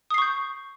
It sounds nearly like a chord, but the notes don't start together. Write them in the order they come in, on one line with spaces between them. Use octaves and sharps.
D#6 C7 C#6 G6